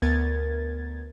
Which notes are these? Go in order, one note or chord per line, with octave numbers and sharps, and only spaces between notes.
D2 B3 A#4 G#6 A6